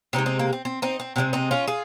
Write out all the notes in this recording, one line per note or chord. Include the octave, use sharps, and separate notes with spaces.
C3 F3 D#4 G4
G#3
C4 D#4
A#3
C4
C4
C4 D#4
C4
C3 F3 G#3 C4
C4 D#4
C#4 F4
F4 G#4